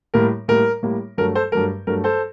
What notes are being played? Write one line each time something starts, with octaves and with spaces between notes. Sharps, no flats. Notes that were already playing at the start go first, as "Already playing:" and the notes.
A2 G3 A#3 A#4
A2 G3 A#3 A#4
A2 G3 A#3
G2 F#3 A3 A#4
A4 C5
G2 F#3 A3 A#4
G2 F#3 A3 A#4
A4 C5